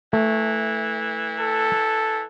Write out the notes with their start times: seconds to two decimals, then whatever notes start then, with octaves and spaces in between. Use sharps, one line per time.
0.13 E3 A3
1.40 A4